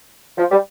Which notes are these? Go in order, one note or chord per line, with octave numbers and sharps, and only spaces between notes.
F3
G3